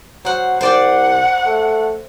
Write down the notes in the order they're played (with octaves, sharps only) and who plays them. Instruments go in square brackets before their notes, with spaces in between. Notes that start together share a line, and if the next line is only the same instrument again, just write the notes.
[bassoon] F#3 [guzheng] C5 F#5
[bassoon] C2 [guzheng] C5 D5 G5 [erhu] F#5
[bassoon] A3